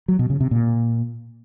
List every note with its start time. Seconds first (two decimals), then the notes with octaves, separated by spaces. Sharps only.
0.08 F#3
0.19 B2
0.30 C#3
0.41 C3
0.51 A#2